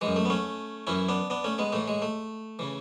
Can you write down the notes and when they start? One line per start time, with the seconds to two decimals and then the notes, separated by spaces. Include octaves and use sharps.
0.01 F#2 E3 G#3
0.16 A3
0.25 B3
0.30 A3 C#4
0.87 F#2 E3 C#4 E4
1.09 B3 D4
1.30 B3 D4
1.44 A3 C#4
1.58 G#3 B3
1.73 A2 E3 A3
1.88 G#3
2.02 A3
2.59 C#3 E3